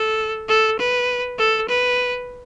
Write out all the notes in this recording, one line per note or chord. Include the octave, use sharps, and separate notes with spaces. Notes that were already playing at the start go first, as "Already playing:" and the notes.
Already playing: A4
A4
B4
A4
B4